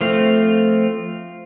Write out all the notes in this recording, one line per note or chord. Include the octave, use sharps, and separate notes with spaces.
F3 A3 C4 F4